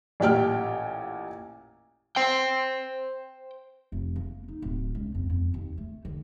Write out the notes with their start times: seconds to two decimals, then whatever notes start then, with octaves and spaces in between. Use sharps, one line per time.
0.20 A1 A#2 G4 G5 F6
2.16 C5 G5
3.92 F1
4.16 A#3
4.48 D#4
4.62 D1
4.95 C#2
5.15 F2
5.30 F2
5.54 D#2
5.78 A3
6.05 D3